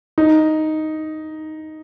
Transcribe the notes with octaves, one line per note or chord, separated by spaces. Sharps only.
D#4